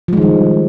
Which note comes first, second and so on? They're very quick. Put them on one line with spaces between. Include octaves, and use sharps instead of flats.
F3 G#3 D#3 G3